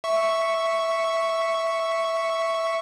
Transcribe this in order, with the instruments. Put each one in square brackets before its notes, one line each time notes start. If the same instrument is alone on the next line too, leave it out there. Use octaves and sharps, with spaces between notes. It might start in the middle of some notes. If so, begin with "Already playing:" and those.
[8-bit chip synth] E5 C#6